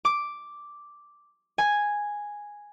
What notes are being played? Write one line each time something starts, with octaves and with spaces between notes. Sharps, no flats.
D6
G#5